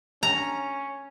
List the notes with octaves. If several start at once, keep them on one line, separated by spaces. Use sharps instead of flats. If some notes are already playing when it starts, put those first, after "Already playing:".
C#4 A#5